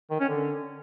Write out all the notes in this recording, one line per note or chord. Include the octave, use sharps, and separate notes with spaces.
D#3
C#4
D3